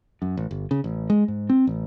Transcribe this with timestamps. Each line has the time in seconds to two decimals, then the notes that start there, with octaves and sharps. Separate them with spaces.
0.22 F#2
0.37 A1
0.51 G1
0.71 C#3
0.84 A1
1.10 G#3
1.28 G#2
1.50 C4
1.67 A1